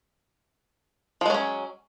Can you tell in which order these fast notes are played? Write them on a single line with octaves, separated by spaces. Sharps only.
F3 G#3 F#3 C#4